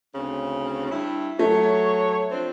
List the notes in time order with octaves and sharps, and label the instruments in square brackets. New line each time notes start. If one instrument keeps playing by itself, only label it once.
[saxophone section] D2 C#3 C4
G2 E4
[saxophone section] F#3 C#5 [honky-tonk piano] A3
[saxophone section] F3 C4 D4